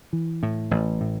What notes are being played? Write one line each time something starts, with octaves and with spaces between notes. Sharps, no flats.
E3
A2
A1
A2